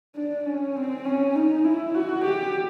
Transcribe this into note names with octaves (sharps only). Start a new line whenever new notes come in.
D4
C#4
C4
C#4
D#4
E4
F#4
G4